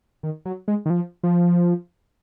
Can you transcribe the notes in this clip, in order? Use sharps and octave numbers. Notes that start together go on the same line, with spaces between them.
D#3
F#3
G#3
D#3
F3
F3